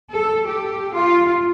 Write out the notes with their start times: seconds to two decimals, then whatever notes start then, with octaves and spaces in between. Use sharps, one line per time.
0.12 A4
0.47 G4
0.94 F4